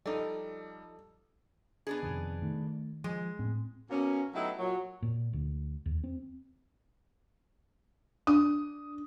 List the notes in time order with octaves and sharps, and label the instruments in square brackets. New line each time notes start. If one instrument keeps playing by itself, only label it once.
[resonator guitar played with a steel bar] F3 D#4 D5 [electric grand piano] G3 [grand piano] A4
[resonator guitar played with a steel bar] B3 D4 G#4
[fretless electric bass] F2 C3 D#3
[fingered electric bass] D#3 [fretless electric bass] A3
[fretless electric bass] F3 [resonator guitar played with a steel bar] G#3
[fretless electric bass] A2 [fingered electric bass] C4
[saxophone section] B2 A#3 C#4
F#3 A3 B3 D#4 E4 G4
A#2 F#3
[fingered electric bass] A#2
D2
D#2
C4
[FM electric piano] D4 [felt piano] D#6